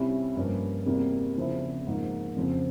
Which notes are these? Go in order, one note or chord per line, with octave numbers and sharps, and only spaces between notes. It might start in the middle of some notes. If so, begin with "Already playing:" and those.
Already playing: C3 G3 C#4 E4
G2 F3 A#3 C#4
E2 C3 G3 A#3
E2 C#3 F3 C4 E4
G#2 F3 A#3
F2 C#3 F3 C4